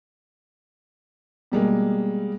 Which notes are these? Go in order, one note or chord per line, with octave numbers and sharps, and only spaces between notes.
B2 G3 G#3 A#3